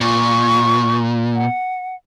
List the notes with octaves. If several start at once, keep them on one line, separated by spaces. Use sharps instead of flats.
A#2 F4 C#6
F#5